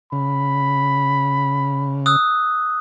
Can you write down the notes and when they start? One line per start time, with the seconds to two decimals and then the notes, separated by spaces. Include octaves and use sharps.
0.12 C#3 B5
2.06 D#6 E6 F#6